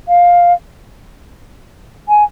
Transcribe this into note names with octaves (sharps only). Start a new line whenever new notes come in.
F5
G#5